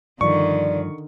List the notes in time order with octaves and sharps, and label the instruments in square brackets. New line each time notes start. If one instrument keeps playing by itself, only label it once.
[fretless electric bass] G2 F3 [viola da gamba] D3 D#3 [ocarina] D5 [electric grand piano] C#6